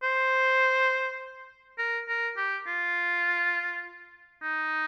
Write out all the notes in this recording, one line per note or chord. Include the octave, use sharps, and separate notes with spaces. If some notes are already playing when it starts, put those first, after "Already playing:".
C5
A#4
A#4
G4
F4
D#4